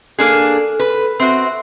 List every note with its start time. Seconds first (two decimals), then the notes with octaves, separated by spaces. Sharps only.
0.19 A#3 D4 G#4 A4
0.80 B4
1.20 C4 F#4 E5